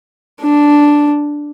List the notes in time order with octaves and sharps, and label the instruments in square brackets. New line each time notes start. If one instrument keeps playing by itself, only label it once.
[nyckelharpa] D4